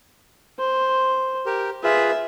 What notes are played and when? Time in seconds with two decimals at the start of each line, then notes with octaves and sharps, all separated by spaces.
0.59 C5
1.46 G4 A#4
1.83 F4 G#4 B4 E5